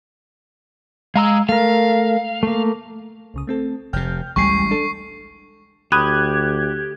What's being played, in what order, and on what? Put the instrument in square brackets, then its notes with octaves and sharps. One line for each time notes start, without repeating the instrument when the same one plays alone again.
[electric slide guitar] G#3 [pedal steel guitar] F5 A#5 E6
[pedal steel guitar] A3 A#4 [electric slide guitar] F5
[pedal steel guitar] A3 A#3
[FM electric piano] C2 C#3 D#6
A3 C4 A4
[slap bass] F1 C3 [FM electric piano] G5 F6 G6
[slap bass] A1 G3 G#3 [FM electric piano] D2 G5 G#5 [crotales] C#6 C7
[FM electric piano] D4 A4
[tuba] D2 [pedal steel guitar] G4 [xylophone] B5 D#6 D#7 [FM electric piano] F#6 G#6